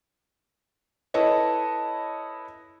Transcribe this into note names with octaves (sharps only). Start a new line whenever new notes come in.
E4 A4 B4 C#5 D#5